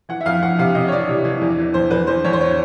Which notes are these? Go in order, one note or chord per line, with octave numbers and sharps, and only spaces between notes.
E3 F#5
E5
F2 F5
F2 F#5
C3 F5
C3 D#5
C#5
E3 D5
C3
E3
E2
E3
E2 C5
E2 B4
E2 C5
E2 C#5
C5
C#5